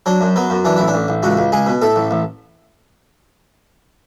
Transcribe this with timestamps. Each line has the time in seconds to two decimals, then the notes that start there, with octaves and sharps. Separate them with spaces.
0.06 F#3 D4
0.21 F#2
0.36 F#3 B3
0.50 F#2
0.65 E3 D4
0.76 A1 E4
0.88 D4
0.94 A1
1.08 A1
1.23 C#2 F#4
1.37 C#2
1.52 C#2 G#4
1.66 B2
1.82 A2 A4
1.96 A1
2.11 A1